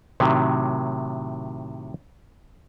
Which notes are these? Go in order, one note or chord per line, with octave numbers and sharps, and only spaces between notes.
A2 C3 D#3 F#3